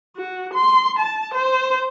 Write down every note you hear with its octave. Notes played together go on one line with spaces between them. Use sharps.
F#4
C6
A5
C5